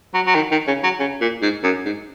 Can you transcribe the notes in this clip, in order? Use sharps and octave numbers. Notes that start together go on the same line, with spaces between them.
F#3
F#3
D#3
D#3
C#3
F#3
C#3
A#2
G#2
F#2
G#2